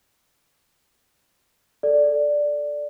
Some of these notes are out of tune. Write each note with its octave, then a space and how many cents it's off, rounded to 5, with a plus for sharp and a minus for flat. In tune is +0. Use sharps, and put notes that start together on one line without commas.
A4 +0 D5 +0